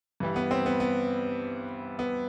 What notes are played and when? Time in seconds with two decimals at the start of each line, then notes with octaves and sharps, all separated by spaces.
0.20 G2 E3 G3
0.36 B3
0.51 C4
0.66 B3
0.80 B3
1.99 B3